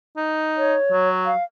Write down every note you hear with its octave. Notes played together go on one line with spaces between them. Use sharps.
D#4
C#5
F#3
F5